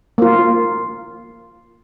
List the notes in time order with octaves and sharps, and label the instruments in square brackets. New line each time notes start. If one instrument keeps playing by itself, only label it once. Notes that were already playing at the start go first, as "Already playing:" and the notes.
[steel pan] A#3 F4